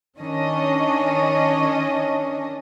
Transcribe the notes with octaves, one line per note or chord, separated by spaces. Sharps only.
D#3 C#4 D4 D#5